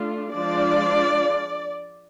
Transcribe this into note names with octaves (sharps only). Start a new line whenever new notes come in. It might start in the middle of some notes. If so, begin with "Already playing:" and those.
Already playing: A3 D4 F4
F3 G#3 D4 F4 D5